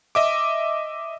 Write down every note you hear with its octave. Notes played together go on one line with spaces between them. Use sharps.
D#5 E5 D6